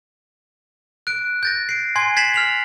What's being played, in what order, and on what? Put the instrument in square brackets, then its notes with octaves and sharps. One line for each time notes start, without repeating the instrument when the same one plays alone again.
[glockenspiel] F#6 D7
G6 A6 A#6
C7 D7
G#5 C6 G#6 C7
G#6 A6 B6 C7 E7 F#7
F6 F7 F#7